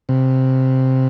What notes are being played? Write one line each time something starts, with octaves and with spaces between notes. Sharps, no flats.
C3